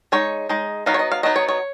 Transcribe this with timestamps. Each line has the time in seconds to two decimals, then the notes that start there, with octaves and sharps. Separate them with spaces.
0.12 G#3 D#4 C#5
0.49 G#3 D#4
0.86 F#3 B3 D#4 F5
0.94 C#5
0.99 D#5
1.12 F5
1.23 F#3 B3 D#4 D#5
1.36 C#5
1.48 C#5